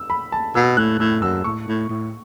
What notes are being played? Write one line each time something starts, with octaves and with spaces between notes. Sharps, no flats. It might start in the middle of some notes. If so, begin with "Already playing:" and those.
Already playing: E6
B5
A5
B2 E6
A2 F#6
A2 E6
F#2 E6
A2 C#6
A2
A2